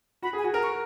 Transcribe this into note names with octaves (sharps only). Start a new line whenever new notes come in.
F#4 B5
G#4
G#5
F#4
A#4 A#5
C#6